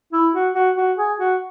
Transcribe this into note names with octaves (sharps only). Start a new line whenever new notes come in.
E4
F#4
F#4
F#4
G#4
F#4